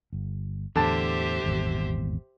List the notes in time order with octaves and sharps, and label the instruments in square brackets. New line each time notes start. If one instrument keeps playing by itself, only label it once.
[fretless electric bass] G1
[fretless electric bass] E2 A2 E3 [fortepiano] D3 A5 [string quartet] G4 C5 E5
[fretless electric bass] D#1 G#1 E2